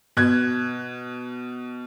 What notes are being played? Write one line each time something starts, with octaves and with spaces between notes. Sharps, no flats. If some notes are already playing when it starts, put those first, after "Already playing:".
B2 F#6 G#6